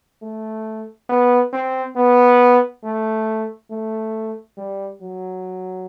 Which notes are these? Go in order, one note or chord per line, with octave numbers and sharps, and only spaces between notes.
A3
B3
C4
B3
A3
A3
G3
F#3